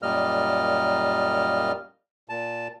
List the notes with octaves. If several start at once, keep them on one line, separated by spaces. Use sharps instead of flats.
F#2 A#2 G3 A#3 D#5 F6
A#2 A5